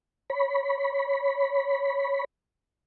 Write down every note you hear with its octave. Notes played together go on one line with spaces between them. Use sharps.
C#5 B5